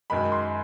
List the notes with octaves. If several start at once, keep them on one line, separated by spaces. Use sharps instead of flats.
F#2 D#3 G#3 B5
C6